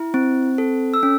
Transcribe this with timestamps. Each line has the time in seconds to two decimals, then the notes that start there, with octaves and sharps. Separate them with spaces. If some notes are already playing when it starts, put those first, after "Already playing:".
Already playing: E4
0.14 C4
0.58 A4
0.94 E6
1.03 C#4